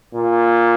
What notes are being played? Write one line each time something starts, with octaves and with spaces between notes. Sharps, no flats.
A#2